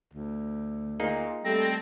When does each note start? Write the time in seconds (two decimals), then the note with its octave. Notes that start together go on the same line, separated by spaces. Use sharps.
0.13 D2
1.00 A#2 A#3 D#4 G#4
1.44 G3 A3 C4 A4 A#6